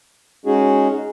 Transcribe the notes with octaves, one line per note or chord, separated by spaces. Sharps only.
G#3 C#4 D#4 F#4 G#4